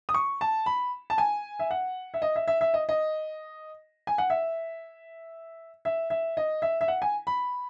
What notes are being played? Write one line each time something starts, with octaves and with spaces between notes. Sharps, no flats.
D#6
C#6
A5
B5
A5
G#5
E5
F#5
E5
D#5
E5
E5
E5
D#5
D#5
G#5
F#5
E5
E5
E5
D#5
E5
E5
F#5
G#5
B5